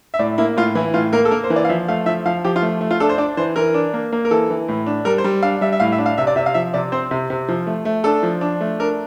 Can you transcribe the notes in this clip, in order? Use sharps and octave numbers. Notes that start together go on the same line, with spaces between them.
E5
A2 D5
A#3 E4
A2 F4
E3 E4
A2 F4
A#3 A#4
A4
A#3 A#4
C5
E3
D5
F5
F3 E5
A3 F5
F3 E5
F3 F5
F3 G4
F4
A3
A3
F4
D4 A4
C5
D4 D5
E3 C5
E3 A#4
D4
A#3
A#3
A#4
E3 A4
E3
A2
D4
G3 A#4
C5
G3
D4 F5
G3 E5
E5
A2 F5
E5
D4
F5
C3 E5
D5
C3 E5
F5
F3 E5
C3 D5
C4 C5
C3
C3
F3
A3
A3
D4 A4
F3
D4
A3
D4 A#4